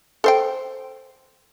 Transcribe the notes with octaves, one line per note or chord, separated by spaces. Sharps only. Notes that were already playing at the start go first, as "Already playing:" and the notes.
A4 C5 G5